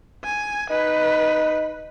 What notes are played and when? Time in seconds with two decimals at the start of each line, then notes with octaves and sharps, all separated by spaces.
0.24 G#5
0.70 D#4 B4